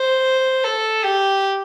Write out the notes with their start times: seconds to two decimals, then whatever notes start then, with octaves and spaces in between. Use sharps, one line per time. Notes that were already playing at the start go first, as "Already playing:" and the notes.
Already playing: C5
0.64 A4
1.04 G4